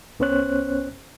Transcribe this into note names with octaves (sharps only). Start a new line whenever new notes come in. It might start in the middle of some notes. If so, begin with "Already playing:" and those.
C2 B3 C#4 C5 C#5 F#6